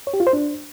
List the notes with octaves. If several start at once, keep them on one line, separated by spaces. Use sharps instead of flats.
C#5
G4
F4
C5
D4